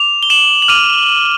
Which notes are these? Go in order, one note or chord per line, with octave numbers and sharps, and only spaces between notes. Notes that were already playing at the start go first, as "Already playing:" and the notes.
Already playing: D6 F7
G7
E7 F#7
F#7
D6 F6 D#7 F7